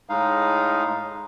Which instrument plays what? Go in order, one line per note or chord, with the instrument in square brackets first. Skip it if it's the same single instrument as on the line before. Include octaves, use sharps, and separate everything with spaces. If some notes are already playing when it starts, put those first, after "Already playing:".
[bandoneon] A2 G#3 D#4 F5